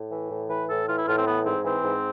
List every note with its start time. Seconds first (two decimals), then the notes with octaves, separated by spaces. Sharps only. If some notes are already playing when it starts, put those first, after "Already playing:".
Already playing: A2
0.12 E3
0.31 A2
0.50 E3 B4
0.69 A2 A4
0.88 E3 F4
0.98 E4
1.07 A2 F4
1.17 C4
1.26 E3 B3
1.45 G#2 C4
1.65 E3 C4
1.84 G#2